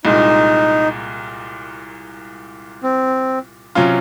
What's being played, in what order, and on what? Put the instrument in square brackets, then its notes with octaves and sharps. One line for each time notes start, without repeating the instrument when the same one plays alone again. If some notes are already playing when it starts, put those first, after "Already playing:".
[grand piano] C2 A#2 G#3 [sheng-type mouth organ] D#4
[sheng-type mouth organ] C4
[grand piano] C3 F#3 C#4 F4